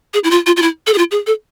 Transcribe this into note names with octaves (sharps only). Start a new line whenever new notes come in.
G#4
E4
F4
F4
F4
E4
A4
G#4
F4
G#4
A4